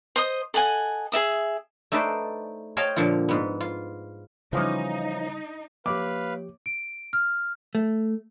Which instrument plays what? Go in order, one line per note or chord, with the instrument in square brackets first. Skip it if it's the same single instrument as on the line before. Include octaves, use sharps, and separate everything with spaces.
[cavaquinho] C5 D#5 D#6
A4 D#5 F#5 G#5
G#4 D5 E5 D#6
[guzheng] A3 D#4 A4 B4 C5 D5
C5 C#5 D#5 F5 G5 A5
A#2 D3 F3 F4
G#2 B3
F4
[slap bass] C#3 G3 [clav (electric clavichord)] E3 F3 C#4 [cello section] D#4
[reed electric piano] F3 G4 [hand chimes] A#3 C#5 [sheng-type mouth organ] B4 F5 [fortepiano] D6
[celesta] D7
F6
[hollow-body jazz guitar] A3